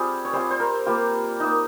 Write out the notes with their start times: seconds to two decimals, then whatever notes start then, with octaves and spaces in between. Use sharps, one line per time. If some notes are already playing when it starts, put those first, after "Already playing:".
Already playing: G3 C4 F4 G#4
0.25 C#5
0.33 G3 C4 F4 C5
0.51 C5
0.60 A#4
0.86 G3 A#3 F4 G4
1.40 A#3 D#4